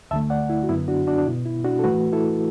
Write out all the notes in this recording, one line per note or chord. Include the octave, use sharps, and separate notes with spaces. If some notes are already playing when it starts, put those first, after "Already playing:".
D2 D3 A3 E5 A5
D5 F#5
E4
F#4
F#2 D3 F#3 B3 E4
D4 F#4
D4 F#4
D4
B2 B3 E4
E4
D4 F#4
A4
A2 E3 A3 F#4 B4
E4 A4